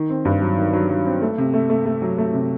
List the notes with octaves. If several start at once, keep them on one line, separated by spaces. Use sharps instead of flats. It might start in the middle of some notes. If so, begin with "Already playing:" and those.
Already playing: D#3
C4
G2
F#3
D#3
F#3
F#3
C4
A3
C3
A3
A3
A3
F#3
A3
C3